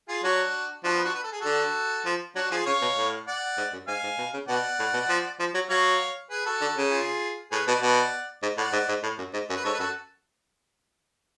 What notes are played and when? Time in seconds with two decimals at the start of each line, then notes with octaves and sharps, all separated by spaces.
0.09 F4 G#4
0.24 F#3 D4 F#4
0.84 F3 D4 F#4
0.94 B3
1.05 D4 F#4
1.15 B4
1.24 A4
1.32 G#4
1.41 D3 F#4 A4
2.05 F3
2.36 F#3 D4 F#4
2.51 F3 F4 G#4
2.66 C#3 C#5 F5
2.82 B2
2.97 A2
3.27 D5 F#5
3.57 G#2
3.73 F#2
3.87 G#2 F5 G#5
4.03 G#2
4.18 B2
4.33 C#3
4.48 B2 D5 F#5
4.79 A2
4.93 B2
5.09 F3
5.39 F3
5.54 F#3
5.70 F#3 C#5 F5
6.30 G#4 B4
6.46 F#4 A4
6.61 D3
6.77 C#3
6.91 F4 G#4
7.51 A2 G#4 B4
7.67 B2 B4 D5
7.82 B2 D5 F#5
8.42 G#2
8.58 A2 D5 F#5
8.73 G#2
8.89 G#2
9.03 A2
9.18 F#2
9.33 G#2
9.49 F#2
9.56 B4
9.64 G#2 A4 C#5
9.74 B4
9.79 F#2 F#4 A4